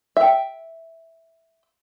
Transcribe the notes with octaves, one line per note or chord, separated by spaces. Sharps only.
E5 G5